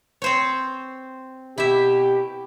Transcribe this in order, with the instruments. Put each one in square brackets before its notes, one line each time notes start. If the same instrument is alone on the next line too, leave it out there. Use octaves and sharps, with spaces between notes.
[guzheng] C4 C5 C#5
[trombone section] B2 G4 [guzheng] E4 E5